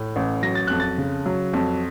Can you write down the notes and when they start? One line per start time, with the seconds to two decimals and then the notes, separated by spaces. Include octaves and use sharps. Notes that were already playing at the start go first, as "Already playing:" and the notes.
Already playing: A2
0.16 A1
0.43 F#3 A#6
0.55 A6
0.67 F2 F#6
0.80 A6
0.98 C#3
1.26 F#3
1.53 F2